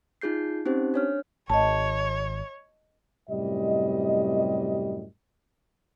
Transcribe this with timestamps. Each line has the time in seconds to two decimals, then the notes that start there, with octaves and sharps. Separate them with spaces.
0.21 D#4 F4 G#4 G6 C7
0.66 C4 C#4 D#4 G4 C5
0.94 D4 C#5 F6
1.50 G#1 C#5 D#5 A5
3.30 F#2 A2 C3 G3 D#5